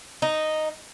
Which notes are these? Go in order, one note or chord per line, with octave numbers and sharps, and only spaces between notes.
D#4